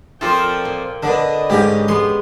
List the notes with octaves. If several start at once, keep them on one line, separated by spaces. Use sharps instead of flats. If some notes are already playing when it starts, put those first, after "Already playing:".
F3 C4 F4 A4 A#4 D5 G5
A#2
D3 D4 B4 D#5
G#2 D3 C#4 G4
G#3 B3 C6